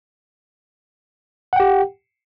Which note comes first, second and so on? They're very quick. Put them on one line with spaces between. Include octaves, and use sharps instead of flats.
F#5 G5 G4